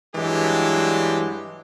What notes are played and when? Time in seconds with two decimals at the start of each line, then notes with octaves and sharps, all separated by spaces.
0.16 G2 E3 F#3 G#3 D4 G4